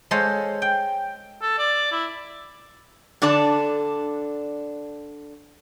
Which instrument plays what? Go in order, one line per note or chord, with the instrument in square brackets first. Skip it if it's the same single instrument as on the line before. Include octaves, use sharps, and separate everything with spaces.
[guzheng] G#3 A4 C5 C#5 F5
G5
[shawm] A4
D5
E4
[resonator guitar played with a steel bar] D3 D4 A4 D5 A5